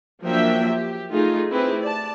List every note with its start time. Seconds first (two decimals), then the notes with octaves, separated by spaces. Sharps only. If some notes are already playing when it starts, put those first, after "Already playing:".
0.23 F3 F#3 A#3 D4 E5 G5
0.69 G4
1.11 A3 D#4 F4 G#4
1.50 A3 C4 E4 G4 G#4 B4
1.82 D5 A5